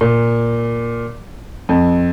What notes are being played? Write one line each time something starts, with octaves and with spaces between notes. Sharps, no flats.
A#2
F2